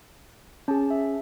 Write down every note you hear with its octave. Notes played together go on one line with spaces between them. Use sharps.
C#4 G#4 A5
E5